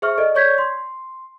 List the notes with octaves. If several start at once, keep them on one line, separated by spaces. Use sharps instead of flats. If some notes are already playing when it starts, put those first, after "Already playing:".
G#4 C5 E5 C#6 F6
A4 D5 D#5
C#5 D5 C#6 G6 G#6 B6
C6